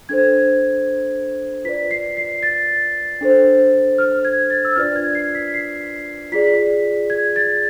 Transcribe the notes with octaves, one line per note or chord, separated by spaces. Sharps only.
D4 A4 C5 G#6
F4 B4 D5 B6
C7
C7
A6
D4 A4 C5
F6
G#6
A6
E6
D4 F4 B4 D5 F6
G#6
C7
B6
C7
F4 G#4 D5 B6
G#6
A6